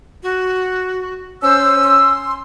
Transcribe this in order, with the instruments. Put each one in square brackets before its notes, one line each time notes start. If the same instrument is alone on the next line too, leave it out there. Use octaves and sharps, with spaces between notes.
[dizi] F#4
[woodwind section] C#4 E6 [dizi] C5
[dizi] C6